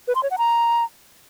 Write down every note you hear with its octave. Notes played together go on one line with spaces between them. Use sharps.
B4
C6
C#5
F#5
A#5